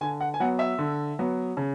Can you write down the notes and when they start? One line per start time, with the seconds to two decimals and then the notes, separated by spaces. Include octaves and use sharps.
0.01 D3 G#5
0.21 F#5
0.34 G#5
0.40 F#3 B3 F#5
0.59 E5
0.79 D3
1.19 F#3 B3
1.57 C#3